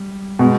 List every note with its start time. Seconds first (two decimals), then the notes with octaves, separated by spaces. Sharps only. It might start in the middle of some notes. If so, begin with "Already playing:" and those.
Already playing: G3
0.39 B2 G#3